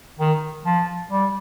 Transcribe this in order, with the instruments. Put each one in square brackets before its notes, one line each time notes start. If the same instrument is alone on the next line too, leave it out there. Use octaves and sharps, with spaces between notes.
[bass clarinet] D#3
F3
G3